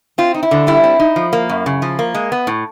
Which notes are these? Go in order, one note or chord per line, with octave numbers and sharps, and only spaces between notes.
C4 F4
D#4
E4
D3
G3 E4
C4
D#4
F3
A#3
F#2
C#3
F3
A#3
G#3
B3
A2